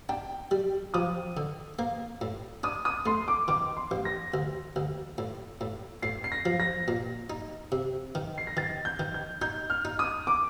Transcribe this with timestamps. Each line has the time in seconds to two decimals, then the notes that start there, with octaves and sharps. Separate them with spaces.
0.09 D4 G5
0.51 G3
0.94 F3 D#6
1.37 D3
1.79 A#3
2.21 A2
2.63 D4 D#6
2.85 D#6
3.06 A3 C6
3.28 D6
3.48 D#3 D6
3.77 C6
3.91 A1
4.05 A#6
4.34 D2
4.76 D2
5.18 A2
5.61 A2
6.02 A2 C7
6.24 C7
6.32 A#6
6.45 F3
6.60 A#6
6.88 A#2
7.30 D#4
7.72 C3
8.15 D#3
8.38 C7
8.47 A#6
8.57 D#3 A6
8.85 G6
8.99 D#3
9.14 G6
9.42 D#4 G6
9.70 F6
9.85 D#4
9.99 D#6
10.27 D6